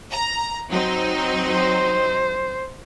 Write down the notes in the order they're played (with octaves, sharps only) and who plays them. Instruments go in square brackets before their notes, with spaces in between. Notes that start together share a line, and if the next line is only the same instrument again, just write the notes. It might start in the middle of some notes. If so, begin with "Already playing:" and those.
[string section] A#5
F#3 C4 D#4
[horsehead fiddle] C5